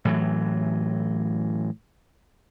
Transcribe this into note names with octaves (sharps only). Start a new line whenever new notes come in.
A2 E3 F#3